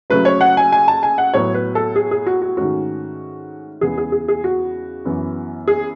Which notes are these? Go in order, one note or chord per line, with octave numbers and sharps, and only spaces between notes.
C#3 F#3 A3 C#4 B4
C#5
F#5
G#5
G#5
A5
G#5
F#5
A2 F#3 B3 C#5
B4
A4
G#4
G#4
F#4
F#4
G#2 D#3 A3 C#4 F#4
E2 C#3 G#3 B3 G#4
G#4
G#4
G#4
F#4
F#2 E3 B3
G#4